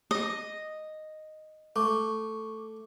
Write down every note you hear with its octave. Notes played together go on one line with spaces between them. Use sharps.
D#5
A3 C#6 D6